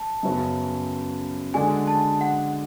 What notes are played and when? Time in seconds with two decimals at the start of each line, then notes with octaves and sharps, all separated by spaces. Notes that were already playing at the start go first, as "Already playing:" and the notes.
Already playing: A5
0.23 F#2 C#3 F#3 B3 F#4
1.54 D3 G#3 D4 F#4 G#5
1.87 A5
2.21 F#5